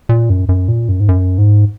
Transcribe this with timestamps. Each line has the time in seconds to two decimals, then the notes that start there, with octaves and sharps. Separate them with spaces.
0.09 A#2
0.30 F#2
0.49 F#2
0.68 A#2
0.89 F#2
1.00 G#2
1.09 F#2
1.38 G#2